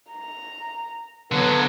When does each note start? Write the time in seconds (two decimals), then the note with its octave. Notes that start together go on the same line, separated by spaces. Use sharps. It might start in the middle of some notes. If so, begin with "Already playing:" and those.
0.11 A#5
1.32 D3 F#3 B3